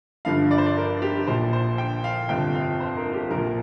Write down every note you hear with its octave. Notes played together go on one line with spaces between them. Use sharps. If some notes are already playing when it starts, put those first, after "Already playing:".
G1 G2 D3 F3 F5
D5
C5
D5
A#4
G4
A#1 A#2 F3 C5
C5
G5
F5
G1 F2 C3 F3 G5
F5
C5
A#4
F4
G4
A#1 A#2 F3 A#4